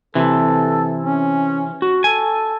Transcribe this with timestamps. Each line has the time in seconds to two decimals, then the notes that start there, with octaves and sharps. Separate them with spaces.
0.15 C3 E3 A4
1.04 C#4
1.82 F#4
2.04 A4 G#5